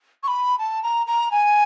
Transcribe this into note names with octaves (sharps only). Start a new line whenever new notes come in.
C#6
B5
A5
A#5
A#5
G#5